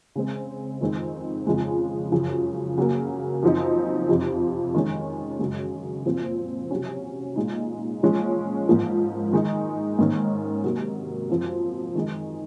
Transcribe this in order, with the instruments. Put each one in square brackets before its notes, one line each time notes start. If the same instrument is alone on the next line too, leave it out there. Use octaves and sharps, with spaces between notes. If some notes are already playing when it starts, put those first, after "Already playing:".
[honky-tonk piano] C#3 G#3 C4
F2 D#3 G#3 C4 D#4
F2 C#3 F3 G#3
F#2 C#3 F3
C#3 F#3 A#3
F#2 F3 C4 D#4
F2 C3 F3
D#3 G#3 C#4
F#2 C#3 G#3
A#2 F3 C4
C3 F#3 C#4
A#2 G#3 D#4
A#2 F3 G#3 C#4
G#2 F3 A#3
D#3 G#3 D#4
G#2 D#3 A#3 C#4
C3 F#3 A#3
F#2 F3 C4
D#3 G#3 D#4